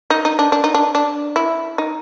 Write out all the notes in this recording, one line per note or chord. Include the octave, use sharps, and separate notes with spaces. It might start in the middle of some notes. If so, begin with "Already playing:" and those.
D#4
D#4
D4
D4
D#4
D4
D4
E4
D#4